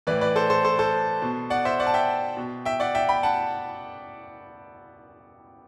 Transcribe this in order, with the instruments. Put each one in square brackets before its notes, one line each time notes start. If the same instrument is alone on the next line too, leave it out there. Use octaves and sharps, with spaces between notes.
[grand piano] A2 E3 B4 D5
B4 D5
A4 C5
A4 C5
A4 C5
A4 C5
B2
D5 F#5
C5 E5
D5 F#5
A5
E5 G5
B2
E5 G5
D5 F#5
E5 G5
G5 B5
F#5 A5